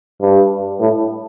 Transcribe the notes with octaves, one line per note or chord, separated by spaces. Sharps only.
G2
A2